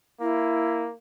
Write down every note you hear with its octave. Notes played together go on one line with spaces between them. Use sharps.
A#3 E4